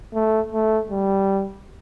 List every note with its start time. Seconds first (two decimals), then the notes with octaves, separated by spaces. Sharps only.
0.14 A3
0.52 A3
0.90 G3